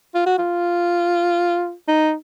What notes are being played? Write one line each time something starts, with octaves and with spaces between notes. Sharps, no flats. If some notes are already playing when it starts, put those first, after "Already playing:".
F4
F#4
F4
D#4